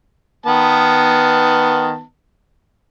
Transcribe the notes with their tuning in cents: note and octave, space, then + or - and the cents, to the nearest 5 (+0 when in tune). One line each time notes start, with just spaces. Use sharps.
D#3 +0 B3 +0 A5 +20